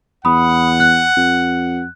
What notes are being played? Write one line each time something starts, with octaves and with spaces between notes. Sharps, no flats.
E2 F#5 B5 D#6
F#6
F2